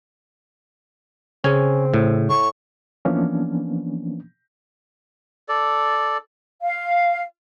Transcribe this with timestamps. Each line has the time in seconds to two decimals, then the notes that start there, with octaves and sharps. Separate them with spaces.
1.44 C#3 C4 C#4 G#4 G#5
1.94 A2
2.29 A2 C#6
3.05 E3 F3 A#3 B3 C#4 D4
5.49 A4 D5
6.62 F5